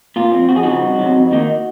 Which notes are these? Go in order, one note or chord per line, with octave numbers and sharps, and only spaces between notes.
A#2 F4
F3 C4
F2 F#4
G#4
C#3 F3 D#4 F#4
C2
C3 D#3 F#3
F2
D#3 A#3 D#4